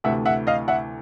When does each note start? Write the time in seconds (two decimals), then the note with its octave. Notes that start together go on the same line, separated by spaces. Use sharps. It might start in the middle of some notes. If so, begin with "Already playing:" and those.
0.04 D2 C3 E3 A3 E5 F#5
0.26 E5 F#5
0.47 D#5 F5
0.68 E5 F#5